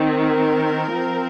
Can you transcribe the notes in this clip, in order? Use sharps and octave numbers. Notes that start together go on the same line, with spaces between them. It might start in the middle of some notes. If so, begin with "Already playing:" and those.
Already playing: D#3 C4
A#4
F3 C4